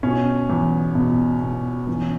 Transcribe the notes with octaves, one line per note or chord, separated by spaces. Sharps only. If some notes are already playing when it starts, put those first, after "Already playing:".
B2 C#4
E2
B2
B2
E2 C#4